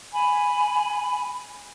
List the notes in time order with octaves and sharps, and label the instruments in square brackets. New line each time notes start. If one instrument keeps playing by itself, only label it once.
[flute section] G#5 B5